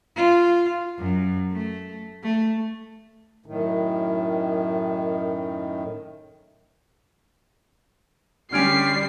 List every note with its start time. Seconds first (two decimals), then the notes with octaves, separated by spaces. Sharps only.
0.16 F4
0.98 F#2
1.51 A3
2.23 A3
3.46 F#2 A2 D#3
8.52 D3 G3 C#4 F6 G#6 C7 D7